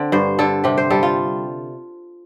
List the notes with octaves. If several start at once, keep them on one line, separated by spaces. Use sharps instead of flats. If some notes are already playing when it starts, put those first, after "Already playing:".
Already playing: D3 C4
G2 C5
D3 A4
C3 G4
C5
G3 A4
F4